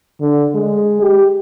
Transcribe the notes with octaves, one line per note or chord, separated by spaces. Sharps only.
D3
G#3
G4